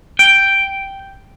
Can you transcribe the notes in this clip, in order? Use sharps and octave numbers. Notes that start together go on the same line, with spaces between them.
G5